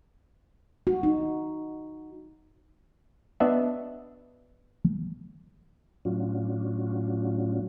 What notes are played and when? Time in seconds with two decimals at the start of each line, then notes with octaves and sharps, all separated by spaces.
0.87 F#4
1.03 D#4
3.40 B3 D4 F#4 D#5 E5 F#5
6.05 A2 F#3 C#4 D4 F4 F#4